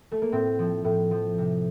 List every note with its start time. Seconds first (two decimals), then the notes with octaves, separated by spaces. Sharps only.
0.12 A3
0.22 A#3
0.32 A2 C4
0.59 F3
0.84 A2
1.11 F3
1.38 C3